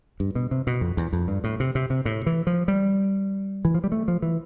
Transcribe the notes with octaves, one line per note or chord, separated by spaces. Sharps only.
G2
B2
C3
B2
F2
E2
F2
G2
A2
C3
C3
C3
A2
E3
F3
G3
E3
F3
G3
A3
F3
E3